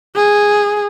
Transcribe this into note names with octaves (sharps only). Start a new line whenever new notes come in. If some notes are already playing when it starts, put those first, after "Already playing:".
G#4